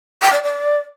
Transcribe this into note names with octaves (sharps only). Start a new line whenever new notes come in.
G5
D5
D5